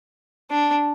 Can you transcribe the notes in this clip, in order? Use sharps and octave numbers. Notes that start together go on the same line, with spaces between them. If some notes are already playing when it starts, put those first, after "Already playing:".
D4